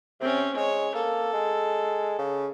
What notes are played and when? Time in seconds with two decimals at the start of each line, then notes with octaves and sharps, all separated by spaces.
0.21 C3 C4 C#4
0.56 G#3 C#5
0.95 A#3 A4
1.33 G#3
2.19 C#3